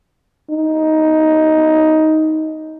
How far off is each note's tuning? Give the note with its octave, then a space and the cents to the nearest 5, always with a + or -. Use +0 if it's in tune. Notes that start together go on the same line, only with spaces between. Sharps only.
D#4 +10